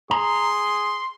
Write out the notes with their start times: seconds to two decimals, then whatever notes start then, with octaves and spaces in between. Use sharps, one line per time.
0.11 G#4 A#5 C6